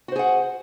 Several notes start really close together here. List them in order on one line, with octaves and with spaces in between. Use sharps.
F#4 C5 G#4 F#5